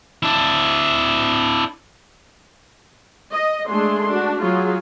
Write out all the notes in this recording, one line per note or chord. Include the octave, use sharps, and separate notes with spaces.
D4 E4
D#5
G#3 A3 D4 G#4 C6
D4 F#4
F#3 F4 G#4